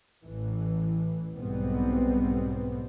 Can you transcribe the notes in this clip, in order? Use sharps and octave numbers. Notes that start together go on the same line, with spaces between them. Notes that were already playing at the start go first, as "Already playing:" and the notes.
A1 A2 E3
B1 G#2 B2 G3 B3 C4